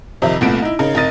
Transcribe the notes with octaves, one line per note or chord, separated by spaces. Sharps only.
F2 C3 D#3 E5
F1 C2 A#2 A3 B3 D7
D#4 E4
C#3 D#4 A#4
F1 A#4 D#5 A6 D#7